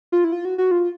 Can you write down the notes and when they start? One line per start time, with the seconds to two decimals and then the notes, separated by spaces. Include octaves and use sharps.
0.12 F4
0.24 E4
0.32 F4
0.45 F#4
0.58 F#4
0.71 F4